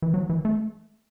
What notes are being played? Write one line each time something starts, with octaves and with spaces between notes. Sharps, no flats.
E3
F#3
E3
A3